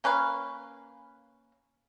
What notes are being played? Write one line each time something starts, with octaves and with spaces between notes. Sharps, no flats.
A#3 C#4 B4 F5